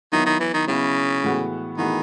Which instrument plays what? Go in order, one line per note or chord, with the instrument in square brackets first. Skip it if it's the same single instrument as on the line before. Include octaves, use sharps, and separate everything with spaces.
[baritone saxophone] D#3 [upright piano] F#3 B3 E4
[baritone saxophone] D#3
E3
D#3
[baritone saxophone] C#3 [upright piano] F#3 B3 E4
[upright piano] A2 E3 G#3 B3 F#4
[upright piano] A2 E3 G#3 B3 F#4 [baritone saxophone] D#3